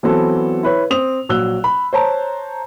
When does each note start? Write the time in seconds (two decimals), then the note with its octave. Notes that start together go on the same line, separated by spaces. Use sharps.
0.03 E3 F#3 B3 C4 A4
0.63 E4 B4 C#5
0.90 C4 D#6 F7
1.29 A#1 F#3 E6 F#6 G7
1.64 B5
1.93 C5 C#5 A5 A#5